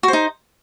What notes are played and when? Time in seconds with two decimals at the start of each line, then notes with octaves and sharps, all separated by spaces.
0.03 F#4
0.08 C5
0.13 D#4